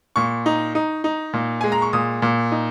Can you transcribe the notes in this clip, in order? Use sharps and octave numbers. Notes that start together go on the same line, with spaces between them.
A#2 C#6
D#4
D#4
D#4
A#2
G#3 G#5
A#5
C#6
A#2 D#6
A#2
D#4